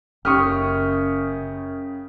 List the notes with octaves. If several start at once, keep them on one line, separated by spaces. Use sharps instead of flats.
F#1 F#2 C#3 C#4 G4 C#6 D#6 F6